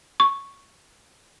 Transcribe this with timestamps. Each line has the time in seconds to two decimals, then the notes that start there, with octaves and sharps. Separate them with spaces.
0.20 C#6